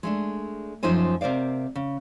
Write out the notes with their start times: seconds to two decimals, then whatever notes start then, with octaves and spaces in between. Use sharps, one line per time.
0.03 G#3 A3 D4
0.83 F#2 F3 D#4 C5 G#5
1.21 C3 A#4 C5 D5 F5
1.75 C#3